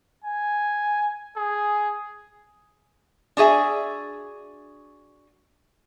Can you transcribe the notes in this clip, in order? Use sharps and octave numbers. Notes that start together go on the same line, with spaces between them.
G#5
G#4
D4 F#4 G#4 E5